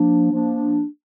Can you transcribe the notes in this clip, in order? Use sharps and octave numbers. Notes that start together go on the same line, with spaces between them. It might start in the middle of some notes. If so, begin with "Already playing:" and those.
Already playing: F3 A#3 D4
F3 A#3 D4